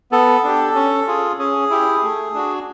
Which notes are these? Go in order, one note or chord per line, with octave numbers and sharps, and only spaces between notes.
B3 A4
D4 G4
C#4
F4 G#4
C#4 G#4
E4 G4
A3
D4 F#4